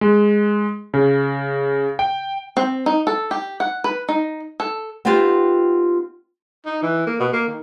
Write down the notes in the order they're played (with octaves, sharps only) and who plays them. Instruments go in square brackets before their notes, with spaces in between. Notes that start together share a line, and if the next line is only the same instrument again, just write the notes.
[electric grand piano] G#3
C#3
G5
[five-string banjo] C4
D#4
A4
G4
F#5
B4
D#4
A4
[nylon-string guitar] B3 C4 D#4 F4 G4
[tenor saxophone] D#4
E3
A#3
B2
A#3
D#3